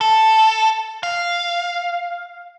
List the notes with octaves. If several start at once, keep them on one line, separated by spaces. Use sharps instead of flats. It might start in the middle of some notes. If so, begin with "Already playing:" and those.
A4
F5